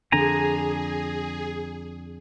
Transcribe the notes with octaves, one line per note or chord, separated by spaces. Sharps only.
F2 D3 G#4 G#5 A#5